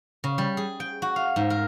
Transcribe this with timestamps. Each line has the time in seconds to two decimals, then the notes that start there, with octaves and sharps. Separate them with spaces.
0.24 C#3
0.38 G3
0.57 G#4
0.80 G5
1.02 F#4
1.16 F5
1.36 G#2
1.50 A#4